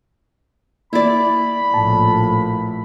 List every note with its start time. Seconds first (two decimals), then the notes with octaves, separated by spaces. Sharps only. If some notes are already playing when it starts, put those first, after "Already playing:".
0.93 A#3 E4 D5 B5
1.74 A#1 A2 A5